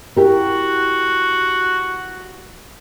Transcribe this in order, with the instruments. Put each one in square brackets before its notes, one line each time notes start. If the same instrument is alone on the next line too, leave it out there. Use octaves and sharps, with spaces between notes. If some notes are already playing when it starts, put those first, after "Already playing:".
[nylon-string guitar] E4 G4 A#4 [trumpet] F#4